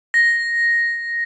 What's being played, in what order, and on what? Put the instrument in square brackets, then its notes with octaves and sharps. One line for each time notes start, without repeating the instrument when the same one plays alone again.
[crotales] A#6